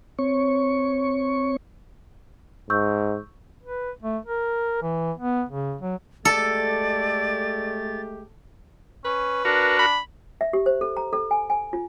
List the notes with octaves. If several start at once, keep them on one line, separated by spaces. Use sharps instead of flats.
C4 C#5 C#6
G#2 C#6 E6 G6
B4
A3
A#4
E3
B3
C#3
F#3
G#3 A3 G4 A4 D5 A6
C#4 B4
D4 F#4 A#4
B5
E5
G4
C5
A4
A#5
A4
G#5
G#5
F4